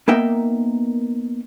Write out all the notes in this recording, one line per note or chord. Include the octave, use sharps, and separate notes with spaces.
A#3 B3 D#4 A#4 E5 G5